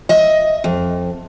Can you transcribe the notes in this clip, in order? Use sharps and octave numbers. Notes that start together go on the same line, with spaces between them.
D#5 E5
F2